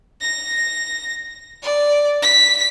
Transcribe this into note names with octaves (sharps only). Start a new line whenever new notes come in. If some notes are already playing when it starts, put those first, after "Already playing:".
A#6
D5
B6